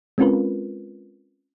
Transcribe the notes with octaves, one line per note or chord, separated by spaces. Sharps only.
G#3 C4 C#4 F4 A#4 B4